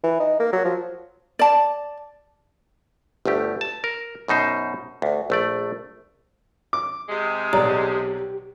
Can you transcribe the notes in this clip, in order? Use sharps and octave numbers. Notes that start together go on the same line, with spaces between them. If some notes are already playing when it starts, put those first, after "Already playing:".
E3
D#4
A#3
F#3
F3
D5 A5
G1 D2 A3 G4
A5
A#4
F#2 B2 D#4 C5
D2
A#1 A3 D5
D6
C3 G#3
B1 G4 D5 A#5 F#6